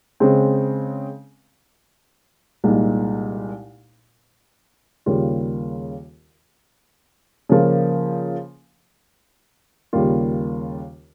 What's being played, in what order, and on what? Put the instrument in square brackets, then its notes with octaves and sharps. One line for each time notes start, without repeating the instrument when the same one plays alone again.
[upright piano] C#3 G#3 C4
C2 A#2 G#3 D#4
D#2 C#3 G3 A#3 F4
C#3 F3 A#3
D#2 C#3 G3 A#3 F4